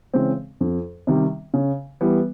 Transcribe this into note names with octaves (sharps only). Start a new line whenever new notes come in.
C#3 E3 G#3 C4
F2
C3 D#3 G3
C#3
E3 G3 B3